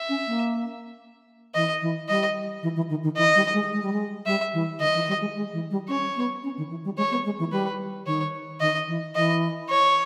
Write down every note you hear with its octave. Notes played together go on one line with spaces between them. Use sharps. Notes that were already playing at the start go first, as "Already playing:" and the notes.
Already playing: E5
C#4
A#3
E3 D#5
E3
G3 D#5
E3
E3
D#3
D#3
E3 D#5
G3
G#3
G#3
G3
G#3
G3 E5
E3
D#3 D#5
E3
G3
G#3
G#3
E3
G3
C#4 C#5
B3
C#4
D#3
E3
G3
G#3 C#5
B3
G#3
E3
G3 B4
D#3 C#5
D#3 D#5
E3
E3 D#5
C#5